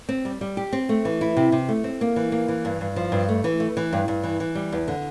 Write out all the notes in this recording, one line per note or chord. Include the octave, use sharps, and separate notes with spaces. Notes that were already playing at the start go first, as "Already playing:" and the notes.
C4
G3
G3
G4
C4
A3
E3
E4
C3
C3
A3
C4
A#3
E3
A#3
E3
G2
G2
F3
G2
A3
E3
A3
E3
G2
G2
E3
E3
G3
E2
D3